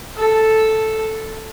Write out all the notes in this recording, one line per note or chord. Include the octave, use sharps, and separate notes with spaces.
A4